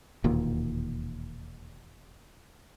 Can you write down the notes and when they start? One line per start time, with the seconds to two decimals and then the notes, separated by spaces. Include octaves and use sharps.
0.24 E1 D#2 A#2